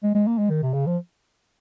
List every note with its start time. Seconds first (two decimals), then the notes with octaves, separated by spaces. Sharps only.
0.03 G#3
0.15 G#3
0.27 A#3
0.38 G#3
0.50 D#3
0.63 C3
0.73 C#3
0.86 F3